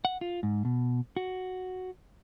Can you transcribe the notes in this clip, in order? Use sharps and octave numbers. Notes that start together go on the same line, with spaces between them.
F#5
F4
G#2
B2
F#4